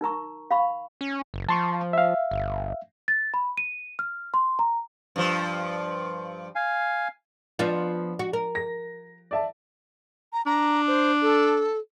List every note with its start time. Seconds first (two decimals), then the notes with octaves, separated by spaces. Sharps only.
0.01 D#4 A#4 A#5 C#6
0.51 F5 B5 C#6
1.01 C#4
1.34 F#1
1.49 F3 A5 C6 C#6
1.93 E5 F5
2.31 G1
3.08 A6
3.34 B5
3.57 D#7
3.99 F6
4.34 C6
4.59 A#5
5.16 G2 F3
6.55 F5 G#5
7.59 F3 B3 D4 F4
8.19 F#4
8.33 A#4
8.55 A#6
9.31 D5 E5 A5
10.33 A#5
10.46 D4 A#5
10.88 C5
11.22 A4